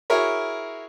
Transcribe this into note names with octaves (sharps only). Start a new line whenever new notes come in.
E4 F#4 G#4 A#4 C#5